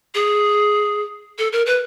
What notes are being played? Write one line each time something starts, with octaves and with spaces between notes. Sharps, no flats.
G#4
A4
A#4
B4